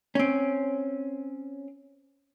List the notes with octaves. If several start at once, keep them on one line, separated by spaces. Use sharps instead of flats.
C4 C#4